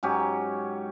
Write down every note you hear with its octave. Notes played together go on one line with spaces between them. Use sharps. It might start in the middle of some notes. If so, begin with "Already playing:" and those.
G#2 F#3 C#4 G4